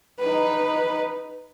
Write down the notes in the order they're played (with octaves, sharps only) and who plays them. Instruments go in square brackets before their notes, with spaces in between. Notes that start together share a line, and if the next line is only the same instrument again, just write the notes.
[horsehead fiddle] D#4 B4